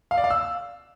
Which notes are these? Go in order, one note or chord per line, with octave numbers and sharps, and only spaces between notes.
F5
D5
F5
E6